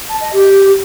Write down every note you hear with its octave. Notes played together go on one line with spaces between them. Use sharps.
A5
D#5
G4